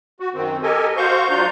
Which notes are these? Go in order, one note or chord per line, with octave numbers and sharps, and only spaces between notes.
F#4
F#2 D#3 C4
G4 A4 A#4 D#5 G#5
F#4 C5 F5 C#6 G6
F#3 D4 F4 A#5 G6